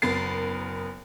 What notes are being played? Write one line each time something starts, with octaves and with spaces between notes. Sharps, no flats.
F#1 B3 A#4 A6 C7